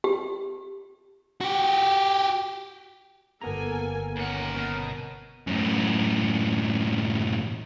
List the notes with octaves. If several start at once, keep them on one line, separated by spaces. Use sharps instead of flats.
G4
F#4 G4
G1 A#3 B3 A4 G#5 A#5
D#2 C#4 A#4 F#5
B2
F#2 A2